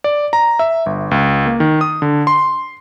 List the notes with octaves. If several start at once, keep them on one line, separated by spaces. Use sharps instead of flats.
D5
A#5
E5
G1
C#2
A#3
D#3
D#6
D3
C6